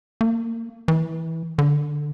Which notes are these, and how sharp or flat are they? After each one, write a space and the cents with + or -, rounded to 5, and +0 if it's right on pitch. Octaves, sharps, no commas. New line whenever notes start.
A#3 -25
E3 -15
D3 +10